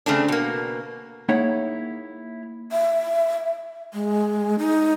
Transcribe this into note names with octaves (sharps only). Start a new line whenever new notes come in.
C#3 A3 C4 D4
B2 A#3
A#3 D#4 E4 G#4 C#5 F#5
E5
G#3
D#4